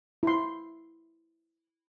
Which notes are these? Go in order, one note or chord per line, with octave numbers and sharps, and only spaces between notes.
E4 C6